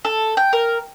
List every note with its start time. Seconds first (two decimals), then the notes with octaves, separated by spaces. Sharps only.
0.05 A4
0.37 G5
0.53 A#4